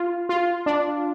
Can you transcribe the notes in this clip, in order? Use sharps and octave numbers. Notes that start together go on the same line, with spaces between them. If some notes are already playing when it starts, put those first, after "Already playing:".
Already playing: F4
F4
D4